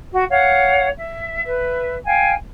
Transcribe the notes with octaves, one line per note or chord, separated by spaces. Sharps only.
F#4
C#5 F5 F#5
E5
B4 E5
F5 G5 G#5